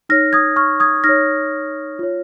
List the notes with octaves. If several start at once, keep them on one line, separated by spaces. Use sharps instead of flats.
D#4 C#5 F6 A#6
D#6 G#6
C#6 F6
D#6 G#6
D#4 F6 A#6
C#5
F4 C#5